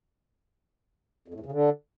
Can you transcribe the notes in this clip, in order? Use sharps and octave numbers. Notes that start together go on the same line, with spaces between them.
F2
A2
E2
C#3
D3